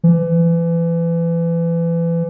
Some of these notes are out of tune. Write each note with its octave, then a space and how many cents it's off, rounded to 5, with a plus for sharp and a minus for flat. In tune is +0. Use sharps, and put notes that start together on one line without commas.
E3 +30